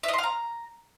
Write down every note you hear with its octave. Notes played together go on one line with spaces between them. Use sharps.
E5
D#5
C6
F5
A#5